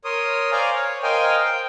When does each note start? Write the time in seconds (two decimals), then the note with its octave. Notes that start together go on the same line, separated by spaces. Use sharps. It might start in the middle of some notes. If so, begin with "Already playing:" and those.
0.05 A#4 C#5 C6 D#6
0.52 C5 D5 F5 G#5 A#5
0.74 C#5
1.03 A#4 C5 D#5 F5 G5 G#5
1.44 G5